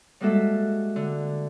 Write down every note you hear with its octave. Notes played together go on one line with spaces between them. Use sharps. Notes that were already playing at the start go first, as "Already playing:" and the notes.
G3 G#3 A#3 F#4 A4 E5
D3